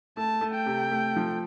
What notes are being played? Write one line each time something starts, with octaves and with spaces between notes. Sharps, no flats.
A3 A5
A3
G5
C3
A3
F3